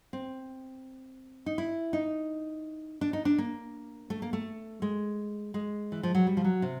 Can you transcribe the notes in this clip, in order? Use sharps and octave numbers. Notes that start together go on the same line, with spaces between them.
C4
D#4
E4
D#4
D4
D#4
D4
A#3
A3
A#3
A3
G#3
G#3
E3
F3
F#3
G3
F3
F#3
C3